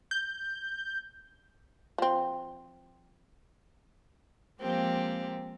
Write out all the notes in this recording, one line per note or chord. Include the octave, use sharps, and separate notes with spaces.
G6
F3 C4
F3 G#3 A#3 C4 G4